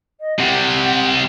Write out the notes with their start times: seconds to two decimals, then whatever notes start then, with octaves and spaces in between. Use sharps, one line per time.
0.20 D#5
0.39 C3 G3 F#5